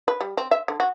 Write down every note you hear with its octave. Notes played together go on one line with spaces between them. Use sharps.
B4
G3
C4
E5
D3
F#4